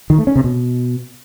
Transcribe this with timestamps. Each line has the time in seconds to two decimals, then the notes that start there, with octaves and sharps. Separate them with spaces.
0.10 D#3
0.18 A3
0.27 C#4
0.36 C3
0.44 B2